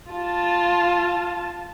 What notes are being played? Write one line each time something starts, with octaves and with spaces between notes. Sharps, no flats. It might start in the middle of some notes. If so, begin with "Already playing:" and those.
F4 A5